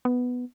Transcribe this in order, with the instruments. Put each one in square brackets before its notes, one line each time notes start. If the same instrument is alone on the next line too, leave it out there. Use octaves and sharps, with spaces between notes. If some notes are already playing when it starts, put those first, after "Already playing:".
[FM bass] B3